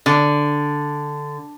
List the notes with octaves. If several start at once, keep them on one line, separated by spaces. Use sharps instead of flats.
D3